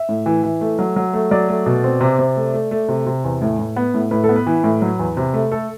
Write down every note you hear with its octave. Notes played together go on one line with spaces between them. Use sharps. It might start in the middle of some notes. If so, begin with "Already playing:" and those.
Already playing: E5
A2
E3
E3
A3
F#3
F#3
A3
F#3 D5
A3
B2
C4
C3
C3
A3
A3
A3
C3
C3
E2
A2
A2
B3
A2
A2 B4
A4
B3
B4
E3
A2
F#3
E2
C3
A3
A3 A4